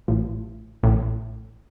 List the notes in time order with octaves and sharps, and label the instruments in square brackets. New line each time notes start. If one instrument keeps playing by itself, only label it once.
[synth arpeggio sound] A1 A2
A1 A2